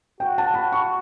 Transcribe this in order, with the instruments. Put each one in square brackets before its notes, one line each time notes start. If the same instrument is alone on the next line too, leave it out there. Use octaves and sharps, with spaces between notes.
[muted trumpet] F#4 [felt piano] G5
[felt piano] A5
B5
C#6